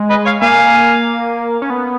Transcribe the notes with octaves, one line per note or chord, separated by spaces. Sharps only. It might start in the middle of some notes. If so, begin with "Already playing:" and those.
Already playing: G#3
B4 D#5
C#5 F5
A#3 F5 G#5
C#4
B3